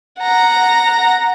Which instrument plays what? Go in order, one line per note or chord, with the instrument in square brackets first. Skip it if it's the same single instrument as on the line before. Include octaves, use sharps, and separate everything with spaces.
[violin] F#5 A#5